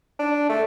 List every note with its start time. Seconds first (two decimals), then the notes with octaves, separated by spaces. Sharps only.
0.19 D4
0.49 A3